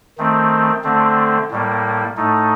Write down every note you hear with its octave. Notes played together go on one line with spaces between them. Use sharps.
D#3 A3 C4
D3 A3 C4
A2 G3 A#3
A2 A3 D#4